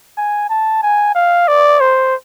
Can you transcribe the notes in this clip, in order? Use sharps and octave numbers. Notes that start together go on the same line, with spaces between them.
G#5
A5
G#5
F5
D5
C5